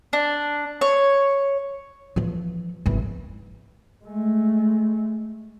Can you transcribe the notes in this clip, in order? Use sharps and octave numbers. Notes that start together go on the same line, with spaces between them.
D4
C#5
E3 F3
G#1 E3
G#3 A3